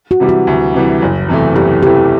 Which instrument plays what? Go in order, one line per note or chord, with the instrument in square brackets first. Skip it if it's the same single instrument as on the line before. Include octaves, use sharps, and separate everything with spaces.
[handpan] F#4
[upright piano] C3 E3 G3
[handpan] F#4
[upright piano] D2
C3 E3 G3
F#1
E2 C3 E3 A3
[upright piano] F#1 [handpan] G4
[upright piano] E2 C3 E3 A3 [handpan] G4